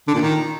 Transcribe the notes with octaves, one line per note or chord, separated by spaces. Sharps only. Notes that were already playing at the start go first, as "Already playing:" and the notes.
D3
A#2
D#3